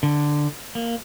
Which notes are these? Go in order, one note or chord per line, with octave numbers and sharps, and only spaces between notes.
D3
A#3